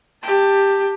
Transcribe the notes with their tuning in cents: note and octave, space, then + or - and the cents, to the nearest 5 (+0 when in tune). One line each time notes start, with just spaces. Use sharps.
G4 +10 A5 +15